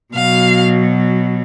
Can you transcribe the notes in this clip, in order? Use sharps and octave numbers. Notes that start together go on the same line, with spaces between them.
B2 F#3 F5